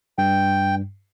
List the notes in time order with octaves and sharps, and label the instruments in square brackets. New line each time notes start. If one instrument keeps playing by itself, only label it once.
[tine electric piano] G2 [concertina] G5